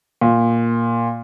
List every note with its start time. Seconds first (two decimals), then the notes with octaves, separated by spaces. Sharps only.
0.21 A#2